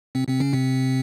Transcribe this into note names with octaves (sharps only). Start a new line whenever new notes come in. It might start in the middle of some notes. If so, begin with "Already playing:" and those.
C3 C4
C3 C4
C#3 C#4
C3 C4